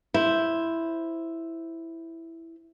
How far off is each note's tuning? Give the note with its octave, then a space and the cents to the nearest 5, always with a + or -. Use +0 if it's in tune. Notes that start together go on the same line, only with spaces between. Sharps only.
E4 +0 C5 +0